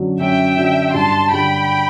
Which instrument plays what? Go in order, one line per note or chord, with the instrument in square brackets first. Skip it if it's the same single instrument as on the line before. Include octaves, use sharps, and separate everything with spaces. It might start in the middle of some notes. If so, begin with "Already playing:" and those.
Already playing: [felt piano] F#2 D3 F#3
[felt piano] F#2 [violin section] E5 G5
[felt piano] D3 F#3
[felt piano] G2 [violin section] A5 C6
[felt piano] D3 G3 [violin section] G5 B5